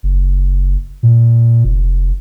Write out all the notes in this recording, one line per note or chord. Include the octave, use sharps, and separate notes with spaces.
F#1
A#2
F1